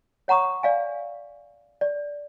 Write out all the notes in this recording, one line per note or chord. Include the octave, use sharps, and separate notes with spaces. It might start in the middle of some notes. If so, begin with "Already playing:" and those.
C#5 F#5 A#5 C#6 D#6
D5 F5 G#5
D5